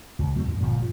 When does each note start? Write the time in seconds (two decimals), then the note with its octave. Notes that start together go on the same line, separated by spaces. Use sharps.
0.19 C#2
0.35 F#3 A3 A#3 C4
0.47 F#2 A2 D3 D#3
0.60 G1 A#2 F3 G3
0.79 G2 E3 F3